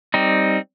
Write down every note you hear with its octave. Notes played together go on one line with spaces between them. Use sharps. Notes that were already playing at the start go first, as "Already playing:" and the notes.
G3 C4 D#4